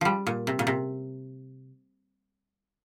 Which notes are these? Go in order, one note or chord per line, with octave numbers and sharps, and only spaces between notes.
F3 G3
A#2
C3
A#2
C3